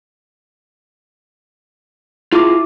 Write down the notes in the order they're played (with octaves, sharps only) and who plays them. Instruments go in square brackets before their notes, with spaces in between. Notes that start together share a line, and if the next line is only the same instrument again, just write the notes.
[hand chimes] E4 D6 [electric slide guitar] F4 G#4